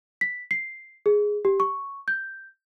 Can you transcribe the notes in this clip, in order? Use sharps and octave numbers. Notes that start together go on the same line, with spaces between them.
B6
C7
G#4
G4
C#6
G6